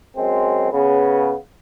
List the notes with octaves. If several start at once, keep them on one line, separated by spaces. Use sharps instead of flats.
F#2 F#3 G#3 C4
C#3 B3